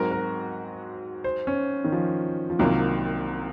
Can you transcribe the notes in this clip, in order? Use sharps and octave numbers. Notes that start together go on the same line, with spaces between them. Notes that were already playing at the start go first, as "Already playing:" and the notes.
Already playing: G#2 F#3 C4 F#4 A#4
A#4
C5
C#4
D#3
F3
F3
C2 C3 D#3 F#3 A#3 F4